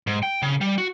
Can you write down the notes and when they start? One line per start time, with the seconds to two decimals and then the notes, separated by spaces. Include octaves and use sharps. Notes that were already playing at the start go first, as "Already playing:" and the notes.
0.07 G#2
0.23 G5
0.42 C#3
0.61 G3
0.78 F#4